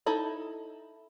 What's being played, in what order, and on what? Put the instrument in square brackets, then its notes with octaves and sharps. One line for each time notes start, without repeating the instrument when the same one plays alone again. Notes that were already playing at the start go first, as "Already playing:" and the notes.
[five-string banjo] D#4 E4 A4 B5